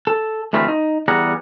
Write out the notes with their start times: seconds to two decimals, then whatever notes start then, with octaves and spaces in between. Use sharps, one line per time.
0.07 A4
0.53 D2 E3 A3 C4 F4 B5
0.68 D#4
1.08 E2 G3 G#4 F#5 A#5